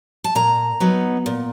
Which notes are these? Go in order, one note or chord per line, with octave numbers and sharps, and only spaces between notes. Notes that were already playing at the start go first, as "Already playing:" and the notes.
A5
A#2 A#5
F#3 B3 D#4
A#2